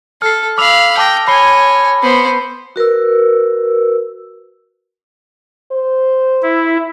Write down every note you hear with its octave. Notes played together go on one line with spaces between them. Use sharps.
A4 F6 C7
F5 B5 D6 E6 F7
G5 A5 D6 A#6
C#5 G#5 B5 C7 G7
B3 C5
F#4 A#4 B4 E6
C5
E4